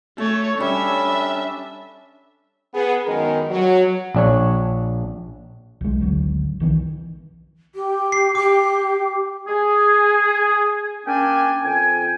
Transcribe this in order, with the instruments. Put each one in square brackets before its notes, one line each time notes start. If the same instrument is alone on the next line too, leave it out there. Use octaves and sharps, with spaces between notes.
[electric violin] A3 C#5 [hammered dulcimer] A4
[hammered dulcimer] G3 C#4 [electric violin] D4 E5
[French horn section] B3 G#4
F#2 D#3 G#3 B3 D#4 A#4
F#3
[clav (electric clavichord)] A#1 D4 C#5
[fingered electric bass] B1 G#3
G#1 D2 F#3
B1 D#3 E3
[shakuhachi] G4
[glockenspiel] C7
[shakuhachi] G4 [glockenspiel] D6
[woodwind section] G#4
A#3 C#4 D4 G5 G#5
F2 G5 G#5